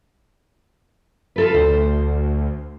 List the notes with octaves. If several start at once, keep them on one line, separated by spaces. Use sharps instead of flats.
F4 A4 B4
D2 C5